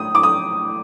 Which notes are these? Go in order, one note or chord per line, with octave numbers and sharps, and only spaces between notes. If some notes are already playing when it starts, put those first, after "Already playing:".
Already playing: A2 D#6
D6
D#6